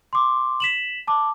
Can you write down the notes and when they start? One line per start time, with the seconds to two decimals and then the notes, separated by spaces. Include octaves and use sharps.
0.13 C6 D6
0.60 B6 E7 F#7
1.07 A5 D6